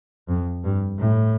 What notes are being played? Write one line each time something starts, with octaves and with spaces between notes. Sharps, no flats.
F2
G2
A2